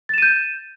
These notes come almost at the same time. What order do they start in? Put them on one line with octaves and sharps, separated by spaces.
A6 E7 D#7 G6